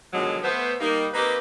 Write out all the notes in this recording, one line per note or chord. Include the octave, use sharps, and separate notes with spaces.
B2 D3 D#3 F3 F#3 G#3
A3 B3 C5
G3 A#3 D#4
A#3 C4 D#4 G4 B4